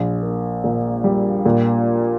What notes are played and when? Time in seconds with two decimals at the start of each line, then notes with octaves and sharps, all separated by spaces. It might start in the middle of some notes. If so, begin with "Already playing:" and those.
Already playing: A#1
0.22 A#3
0.64 A#2
1.04 G3
1.45 A#2